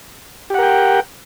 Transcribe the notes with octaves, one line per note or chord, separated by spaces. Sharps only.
G4 A#4 F#5 G5